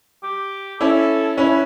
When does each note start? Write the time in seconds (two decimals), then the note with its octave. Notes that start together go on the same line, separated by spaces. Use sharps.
0.23 G4
0.80 C#4 E4 A4
1.38 C#4 E4 B4